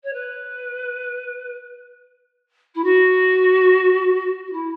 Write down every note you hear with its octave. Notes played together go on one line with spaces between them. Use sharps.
C#5
B4
E4
F#4
F#4
E4